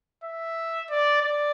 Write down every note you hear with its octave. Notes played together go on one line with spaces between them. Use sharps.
E5
D5
D5